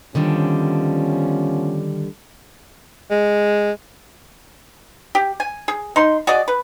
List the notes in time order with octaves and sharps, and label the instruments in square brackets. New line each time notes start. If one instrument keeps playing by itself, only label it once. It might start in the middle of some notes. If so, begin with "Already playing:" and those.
[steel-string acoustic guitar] D3 D#3 G3 [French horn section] F3 B3 C#4
[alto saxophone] G#3
[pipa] G4
G#5
G#4
D#4 C6
F#4 G#4 D5 D#5
B4